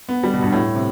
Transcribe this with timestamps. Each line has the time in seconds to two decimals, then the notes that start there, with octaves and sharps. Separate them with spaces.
0.09 B3
0.24 G3
0.34 B2
0.43 G2
0.52 A2
0.75 C3